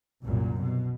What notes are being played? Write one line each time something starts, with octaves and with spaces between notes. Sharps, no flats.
C2 F#2 A#2
B2